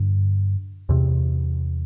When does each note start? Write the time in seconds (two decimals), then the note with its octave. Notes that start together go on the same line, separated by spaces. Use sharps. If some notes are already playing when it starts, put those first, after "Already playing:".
Already playing: G2 D3
0.89 E2 C3